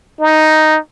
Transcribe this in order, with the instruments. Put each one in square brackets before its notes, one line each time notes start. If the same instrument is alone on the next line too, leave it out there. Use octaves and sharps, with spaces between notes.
[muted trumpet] D#4